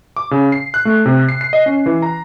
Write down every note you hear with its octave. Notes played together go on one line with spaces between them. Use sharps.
D6
C#3
C7
F#6
A3
C3
C7
C7
D#5
C#4
E3
A#5